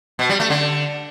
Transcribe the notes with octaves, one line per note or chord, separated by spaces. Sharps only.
B2
G3
A3
D3